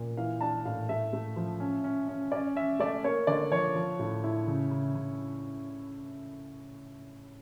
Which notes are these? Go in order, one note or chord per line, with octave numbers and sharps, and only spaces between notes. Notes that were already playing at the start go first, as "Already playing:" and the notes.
Already playing: A#2
E3 F5
D4 A5
A2 F5
A3 E5
A3
F3
C#4
C#4
C#4
C#4 D5
C#4 E5
A3 D5
A#3 C#5
D3 D5
F3 C#5
F3
A2
E4
C#3
C#3
C#3